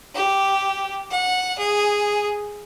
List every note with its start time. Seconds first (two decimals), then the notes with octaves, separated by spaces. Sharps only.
0.15 G4
1.11 F#5
1.59 G#4